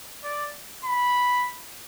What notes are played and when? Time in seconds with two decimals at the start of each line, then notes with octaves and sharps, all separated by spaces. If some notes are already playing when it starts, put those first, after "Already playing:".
0.24 D5
0.84 B5